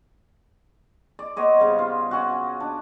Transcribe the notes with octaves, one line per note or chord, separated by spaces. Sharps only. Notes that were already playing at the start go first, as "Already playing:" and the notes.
D5
B3 C5 C#5 D#5
C#3 G3
F4
C#4 F#4
D4